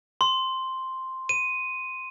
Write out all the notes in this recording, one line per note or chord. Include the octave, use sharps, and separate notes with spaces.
C6
D#7